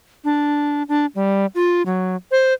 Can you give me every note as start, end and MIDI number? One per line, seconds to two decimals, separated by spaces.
0.24 0.83 62
0.89 1.06 62
1.15 1.46 55
1.55 1.82 65
1.86 2.16 54
2.31 2.54 72